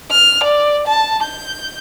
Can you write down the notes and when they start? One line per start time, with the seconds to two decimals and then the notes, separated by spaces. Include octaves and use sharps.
0.11 F6
0.43 D5
0.87 A5
1.22 G6